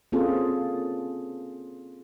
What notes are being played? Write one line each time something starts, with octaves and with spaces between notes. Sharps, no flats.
A#3 C4 C#4 F4 G#4 A4